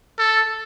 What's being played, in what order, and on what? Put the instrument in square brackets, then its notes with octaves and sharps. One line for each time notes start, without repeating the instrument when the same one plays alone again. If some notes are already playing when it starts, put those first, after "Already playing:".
[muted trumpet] A4